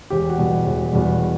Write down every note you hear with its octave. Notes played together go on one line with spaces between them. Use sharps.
E1 G4
F#4
E2 B2 G3
E1
E2 B2 G3